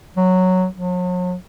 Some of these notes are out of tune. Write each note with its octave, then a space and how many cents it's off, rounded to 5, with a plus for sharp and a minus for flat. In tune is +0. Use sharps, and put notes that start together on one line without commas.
F#3 -5
F#3 -40